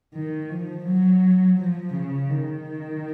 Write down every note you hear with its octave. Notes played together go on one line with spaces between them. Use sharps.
D#3
F3
F#3
F3
C#3
D#3